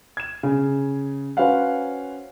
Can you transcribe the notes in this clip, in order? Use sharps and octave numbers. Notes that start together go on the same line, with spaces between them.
G#6 E7
C#3
C#4 F#4 B4 C5 F5 F#5